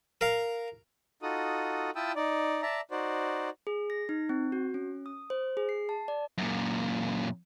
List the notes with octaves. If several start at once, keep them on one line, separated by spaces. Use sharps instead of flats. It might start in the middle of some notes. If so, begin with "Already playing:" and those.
A#4 F5
D#4 F4 F#4 A4 D#6
E4 F4 G5 A5 D#6 E6
D#4 D5
D5 E5 A5 A#5
D#4 F#4 C5 D5
G#4
A#6
D#4
C4
F#4
C#4
D#6
C5
G#4
C7
A5
D5
F#2 A#2